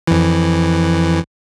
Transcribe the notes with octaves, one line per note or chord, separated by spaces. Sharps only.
F2 E3